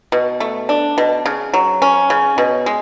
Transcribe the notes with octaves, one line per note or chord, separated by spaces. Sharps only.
B2
A3
D4
B2
C#3
F#3
C#4
C#3
B2
G#3